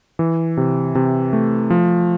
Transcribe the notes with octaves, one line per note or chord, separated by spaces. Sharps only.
E3
C3
C3
A3
F3